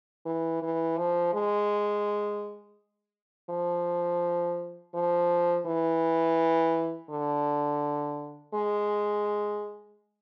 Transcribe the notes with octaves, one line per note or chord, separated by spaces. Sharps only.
E3
E3
F3
G#3
F3
F3
E3
D3
G#3